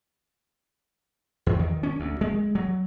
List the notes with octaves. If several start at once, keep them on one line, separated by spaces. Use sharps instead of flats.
E2
D#3
C#4
D2
G#3
F#3